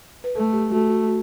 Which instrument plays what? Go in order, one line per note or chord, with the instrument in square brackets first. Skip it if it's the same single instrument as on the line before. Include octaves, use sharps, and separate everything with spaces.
[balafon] B4
[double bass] A3 [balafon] A4
[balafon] G4
[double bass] A3 [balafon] F#4
[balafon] F#4
F#4